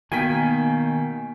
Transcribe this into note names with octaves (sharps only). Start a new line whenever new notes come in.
B2 D#3 A#3 G5 G#5 B6